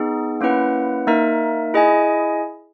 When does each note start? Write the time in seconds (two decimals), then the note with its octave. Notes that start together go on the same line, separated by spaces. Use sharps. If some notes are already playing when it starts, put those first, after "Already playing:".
Already playing: B3 D#4 G#4
0.41 A#3 C#4 E4 B4 F#5
1.07 A#3 D#4 A#4 E5
1.74 E4 G#4 D#5 G#5